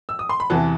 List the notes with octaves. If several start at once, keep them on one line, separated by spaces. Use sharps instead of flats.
E6
D#6
C6
B5
E2 C3 E3 F#5 A5